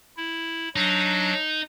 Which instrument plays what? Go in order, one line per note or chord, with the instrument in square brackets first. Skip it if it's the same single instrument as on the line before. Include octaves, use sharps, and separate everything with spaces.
[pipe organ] E4
[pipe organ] F#3 D4 [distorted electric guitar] D#4